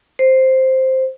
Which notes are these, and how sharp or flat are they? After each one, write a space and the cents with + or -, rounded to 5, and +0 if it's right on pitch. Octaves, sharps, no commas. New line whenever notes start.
C5 +0